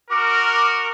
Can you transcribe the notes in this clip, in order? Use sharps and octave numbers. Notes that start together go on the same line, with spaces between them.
F#4 A#4 D6